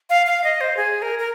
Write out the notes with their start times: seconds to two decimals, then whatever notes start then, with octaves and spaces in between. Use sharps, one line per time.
0.10 F5
0.27 F5
0.44 D#5
0.61 C5
0.77 G#4
1.02 A#4
1.19 A#4